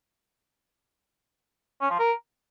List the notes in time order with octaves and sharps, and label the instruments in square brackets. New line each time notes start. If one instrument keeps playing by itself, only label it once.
[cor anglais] C#4
F3
A#4